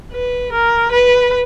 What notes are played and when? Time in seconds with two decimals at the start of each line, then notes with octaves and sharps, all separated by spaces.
0.12 B4
0.52 A#4
0.92 B4